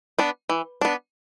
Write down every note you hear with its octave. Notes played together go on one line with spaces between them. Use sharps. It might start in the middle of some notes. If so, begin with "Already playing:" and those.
B3 D4
E3
B3 D4